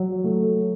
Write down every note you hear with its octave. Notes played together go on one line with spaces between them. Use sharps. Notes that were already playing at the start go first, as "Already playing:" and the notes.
Already playing: F#3
A3